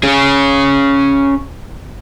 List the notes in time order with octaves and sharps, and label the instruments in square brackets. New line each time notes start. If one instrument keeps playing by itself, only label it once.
[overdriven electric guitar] C#4 G#4